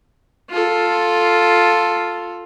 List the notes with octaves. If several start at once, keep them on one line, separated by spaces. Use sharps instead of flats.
F4 A4